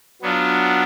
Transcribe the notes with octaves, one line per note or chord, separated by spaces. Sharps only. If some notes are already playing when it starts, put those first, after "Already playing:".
F#3 B3 D4 F4